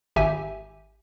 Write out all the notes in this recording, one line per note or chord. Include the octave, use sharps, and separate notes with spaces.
G#1 G4 E5 G#5